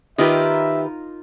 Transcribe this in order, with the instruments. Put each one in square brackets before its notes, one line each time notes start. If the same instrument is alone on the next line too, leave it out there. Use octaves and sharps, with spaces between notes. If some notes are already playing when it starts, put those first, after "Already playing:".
[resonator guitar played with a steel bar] D#3 G4 B4 [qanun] D#4 F4 A#4 [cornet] E5